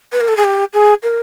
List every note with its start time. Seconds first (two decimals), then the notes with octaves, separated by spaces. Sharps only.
0.12 B4
0.20 A#4
0.28 A4
0.37 G#4
0.44 G4
0.73 G#4
1.03 A#4